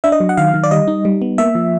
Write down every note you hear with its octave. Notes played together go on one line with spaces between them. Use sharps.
D4 E5
D#5
F#3
F#5
D#3 F5
D#3
D5
G3 D#5
D#4
G3
B3
A#3 E5
F3